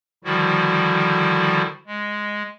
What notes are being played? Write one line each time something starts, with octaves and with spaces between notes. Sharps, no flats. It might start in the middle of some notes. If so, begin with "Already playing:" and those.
D3 D#3 F3 G3 E4 F#4
G#3